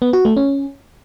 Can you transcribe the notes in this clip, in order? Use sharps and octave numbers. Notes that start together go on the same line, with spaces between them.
B3
F#4
A3
C#4